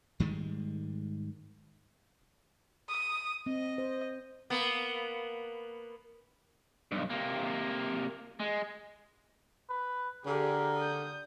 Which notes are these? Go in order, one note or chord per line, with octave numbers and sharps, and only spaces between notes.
G#2 D#3 G3 G#3
D#6
C4 D#5
C5
A#3 B3
B1 G2
C3 A#3
G#3
B4
D3 G4 G#4 A#4
D#6 G6